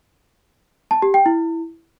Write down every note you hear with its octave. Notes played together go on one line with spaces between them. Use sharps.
A5
G4
G5
E4